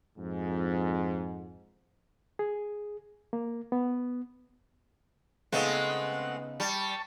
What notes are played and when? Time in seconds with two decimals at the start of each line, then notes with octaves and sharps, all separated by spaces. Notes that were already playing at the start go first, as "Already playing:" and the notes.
0.18 F2 G#2
2.39 G#4
3.33 A#3
3.72 B3
5.52 C#3 G#3 A3 B3 C4 D#4 F#5
6.60 G3 A5 C#6